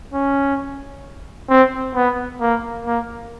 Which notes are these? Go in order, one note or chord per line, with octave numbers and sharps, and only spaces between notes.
C#4
C4
B3
A#3
A#3